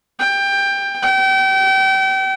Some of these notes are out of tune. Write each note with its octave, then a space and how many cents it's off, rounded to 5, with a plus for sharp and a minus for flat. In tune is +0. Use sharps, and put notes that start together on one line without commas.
G5 +20
G5 -35